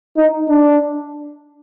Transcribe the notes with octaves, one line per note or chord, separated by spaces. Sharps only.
D#4
D4